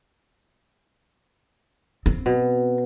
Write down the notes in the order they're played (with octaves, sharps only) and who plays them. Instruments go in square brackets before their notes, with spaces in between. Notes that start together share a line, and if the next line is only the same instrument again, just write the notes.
[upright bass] C4
[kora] B2